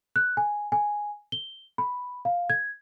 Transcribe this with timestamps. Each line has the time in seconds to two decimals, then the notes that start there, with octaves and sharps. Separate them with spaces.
0.16 F#6
0.37 G#5
0.72 G#5
1.32 G7
1.78 B5
2.25 F5
2.50 G#6